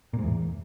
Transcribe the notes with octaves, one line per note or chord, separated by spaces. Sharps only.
A#2
G#2
E2